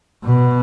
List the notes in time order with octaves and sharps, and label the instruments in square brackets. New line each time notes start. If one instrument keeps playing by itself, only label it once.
[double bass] B2